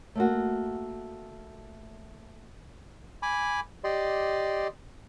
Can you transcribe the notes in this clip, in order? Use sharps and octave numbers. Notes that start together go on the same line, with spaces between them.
A3 A#3 F#4
G#5 B5 D6
G4 D5 D#5 C6